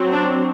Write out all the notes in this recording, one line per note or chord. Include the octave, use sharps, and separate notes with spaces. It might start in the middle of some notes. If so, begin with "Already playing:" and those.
Already playing: F#3 C4
D4